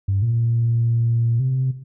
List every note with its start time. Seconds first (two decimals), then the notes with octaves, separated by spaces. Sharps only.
0.08 G2
0.22 A#2
1.40 C3